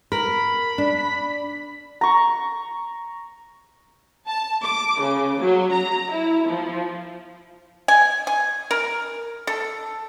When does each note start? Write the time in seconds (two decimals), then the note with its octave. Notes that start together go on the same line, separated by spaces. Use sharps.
0.12 A#4 B5
0.78 D4
2.01 A#5 C#6
4.27 A5
4.64 D6
5.00 C#3
5.41 F#3
5.73 A#5
6.12 E4
6.48 F3
7.88 G#5
8.27 G#5
8.71 A#4
9.47 A4